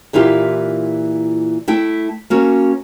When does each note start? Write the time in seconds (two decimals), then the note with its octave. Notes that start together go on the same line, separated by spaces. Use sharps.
0.13 A#2 E3 E4 F4 G4
1.68 A3 E4 G5
2.30 A#3 C#4 F#4